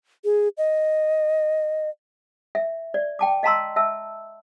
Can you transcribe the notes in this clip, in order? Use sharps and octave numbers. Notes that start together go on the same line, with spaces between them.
G#4
D#5
E5
D5
G5 A5 D6
D#5 F5 A5 A#5 C6 E6
E5 A5 E6